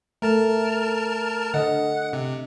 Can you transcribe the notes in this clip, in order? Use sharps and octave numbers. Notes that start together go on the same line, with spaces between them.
A3 A#4 A5 F6
D3 D#5 F#5
C3